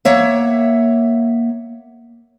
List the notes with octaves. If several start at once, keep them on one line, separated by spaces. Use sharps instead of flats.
A#3 C#5 E5 F#5